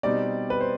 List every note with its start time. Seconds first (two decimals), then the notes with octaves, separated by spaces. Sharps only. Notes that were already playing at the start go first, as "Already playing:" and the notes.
0.03 B2 G3 C4 D#4 D5
0.50 B4
0.61 C5